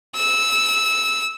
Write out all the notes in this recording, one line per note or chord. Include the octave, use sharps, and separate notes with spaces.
E6